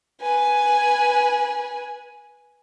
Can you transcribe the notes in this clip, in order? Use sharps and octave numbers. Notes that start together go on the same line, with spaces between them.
B4 G#5